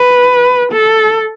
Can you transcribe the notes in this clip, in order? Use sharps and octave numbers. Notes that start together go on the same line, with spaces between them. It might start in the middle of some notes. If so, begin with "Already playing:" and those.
Already playing: B4
A4